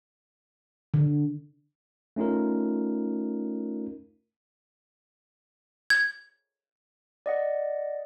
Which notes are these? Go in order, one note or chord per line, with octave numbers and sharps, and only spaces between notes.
D3
A3 C#4 D#4 F4 A#4
G#6
D5 D#5 F#5